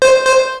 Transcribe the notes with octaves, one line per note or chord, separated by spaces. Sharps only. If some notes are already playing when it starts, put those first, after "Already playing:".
C5
C5